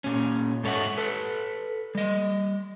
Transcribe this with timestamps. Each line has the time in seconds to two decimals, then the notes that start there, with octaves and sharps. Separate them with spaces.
0.04 A#2 C#4
0.63 G#2 A4 C#5 E5 F#5
0.98 A4 B4
1.95 G3 D#5